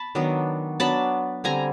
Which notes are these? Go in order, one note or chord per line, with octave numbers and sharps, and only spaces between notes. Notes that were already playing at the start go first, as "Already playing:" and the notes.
Already playing: A5 B5
D#3 F#3 B3 D4
F#3 B3 D4 A5 B5
D3 G3 C4 G#5 A#5